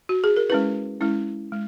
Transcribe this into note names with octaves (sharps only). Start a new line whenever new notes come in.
F#4
G#4
A#4
G#3 C#4 E4 B4
G#3 C#4 E4
G#3